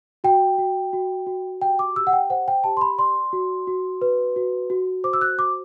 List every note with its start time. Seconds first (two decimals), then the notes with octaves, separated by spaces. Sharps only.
0.24 F#4 G5
0.58 F#4
0.93 F#4
1.27 F#4
1.62 G4 G5
1.79 D6
1.96 G4 E6
2.07 F#5
2.13 G5
2.30 C5 F#5
2.48 G5
2.64 G4 A5
2.77 C6
2.81 B5
2.98 D5 C6
3.33 F#4
3.67 F#4
4.01 B4
4.36 F#4
4.70 F#4
5.04 C5 D6
5.13 E6
5.21 F#6
5.38 F#4 D6